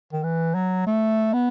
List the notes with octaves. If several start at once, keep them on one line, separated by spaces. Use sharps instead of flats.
D#3
E3
F#3
A3
B3